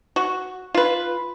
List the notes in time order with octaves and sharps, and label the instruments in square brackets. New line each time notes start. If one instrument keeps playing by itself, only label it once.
[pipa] F#4
F4 B4